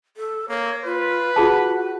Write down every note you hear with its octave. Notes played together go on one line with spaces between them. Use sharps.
A4
A#3 C#5
F4 B4
F4 F#4 G#4 A5